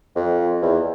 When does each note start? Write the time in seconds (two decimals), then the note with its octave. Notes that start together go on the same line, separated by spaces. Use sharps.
0.16 F2
0.62 E2